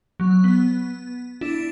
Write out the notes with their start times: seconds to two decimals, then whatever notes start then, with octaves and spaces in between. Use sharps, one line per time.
0.20 F#3
0.44 B3
1.41 D4 E4